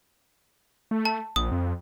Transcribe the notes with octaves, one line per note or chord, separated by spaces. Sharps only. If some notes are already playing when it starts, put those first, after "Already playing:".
A3
A5
A#1 D#6
F2